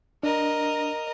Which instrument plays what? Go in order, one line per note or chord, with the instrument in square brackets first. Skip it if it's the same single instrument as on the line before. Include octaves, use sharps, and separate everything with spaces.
[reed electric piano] D4 [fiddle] A#4 D#5